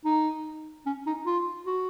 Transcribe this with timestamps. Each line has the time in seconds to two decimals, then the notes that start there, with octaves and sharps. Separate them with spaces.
0.05 D#4
0.86 C#4
1.06 D#4
1.26 F4
1.66 F#4